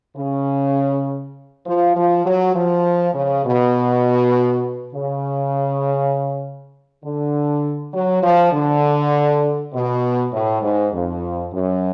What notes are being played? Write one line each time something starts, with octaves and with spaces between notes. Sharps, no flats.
C#3
F3
F3
F#3
F3
C#3
B2
C#3
D3
F#3
F3
D3
B2
A2
G#2
F2
F#2